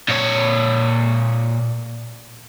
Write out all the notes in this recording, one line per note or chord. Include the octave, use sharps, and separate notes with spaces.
A#2 C#5